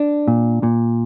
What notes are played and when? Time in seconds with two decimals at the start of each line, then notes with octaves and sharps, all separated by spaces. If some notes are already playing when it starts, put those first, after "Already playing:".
Already playing: D4
0.28 A#2
0.63 A#2